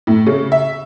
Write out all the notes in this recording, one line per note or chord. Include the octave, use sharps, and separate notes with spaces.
A2
C#3
E5